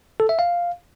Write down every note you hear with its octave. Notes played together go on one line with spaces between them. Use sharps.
A4
E5
F5